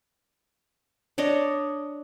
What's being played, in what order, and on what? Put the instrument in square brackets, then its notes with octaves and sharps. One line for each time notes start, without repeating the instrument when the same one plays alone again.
[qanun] D4 C#5 D#5